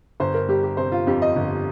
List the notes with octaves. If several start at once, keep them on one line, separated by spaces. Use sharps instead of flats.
G1 C5
A#4
G3 G4
G4
C3 C5
F4
F2 G4
D#5
G1